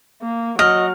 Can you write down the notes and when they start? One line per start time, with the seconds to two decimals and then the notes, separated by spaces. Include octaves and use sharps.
0.22 A#3
0.59 F#3 D#5 F6